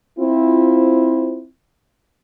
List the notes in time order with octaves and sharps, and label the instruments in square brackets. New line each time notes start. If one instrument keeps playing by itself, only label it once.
[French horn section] C4 E4 F4